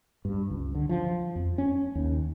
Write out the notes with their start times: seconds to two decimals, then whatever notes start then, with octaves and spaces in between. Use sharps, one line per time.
0.25 G2
0.50 C#2
0.75 D3
0.89 F3
1.36 F2
1.58 C#4
1.95 D#2